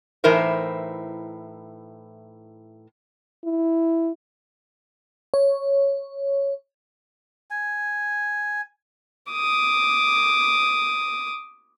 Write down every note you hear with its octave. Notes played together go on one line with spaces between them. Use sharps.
A2 E3 D#4 E4 A#4 C5
E4
C#5
G#5
D6 D#6